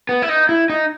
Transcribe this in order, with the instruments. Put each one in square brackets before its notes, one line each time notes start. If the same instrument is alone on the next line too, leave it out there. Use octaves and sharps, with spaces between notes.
[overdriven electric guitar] B3
E4
D#4
E4
D#4